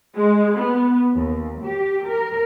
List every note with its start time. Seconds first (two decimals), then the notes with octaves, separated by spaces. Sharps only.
0.15 G#3
0.57 B3
1.14 D#2
1.63 G4
2.06 A#4